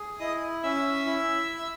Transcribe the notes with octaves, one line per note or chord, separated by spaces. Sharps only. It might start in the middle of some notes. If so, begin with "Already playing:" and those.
Already playing: G#4
E4 D#5 D#6
C#4 E5 E6
E4